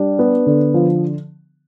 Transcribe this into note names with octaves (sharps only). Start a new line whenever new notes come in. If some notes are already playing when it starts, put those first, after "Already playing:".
Already playing: G3 D4
B3
D3
F3